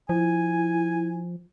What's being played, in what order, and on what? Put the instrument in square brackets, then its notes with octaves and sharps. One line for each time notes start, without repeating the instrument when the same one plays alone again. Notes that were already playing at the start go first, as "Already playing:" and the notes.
[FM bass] F3 [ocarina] E4 [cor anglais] G#5